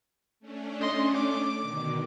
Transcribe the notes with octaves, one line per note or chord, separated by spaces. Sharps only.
A3 C#4 D4
D#5 C6
D6
B2 D3 D#3